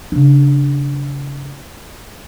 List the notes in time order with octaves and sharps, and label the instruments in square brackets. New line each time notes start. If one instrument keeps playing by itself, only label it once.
[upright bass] C#3 D4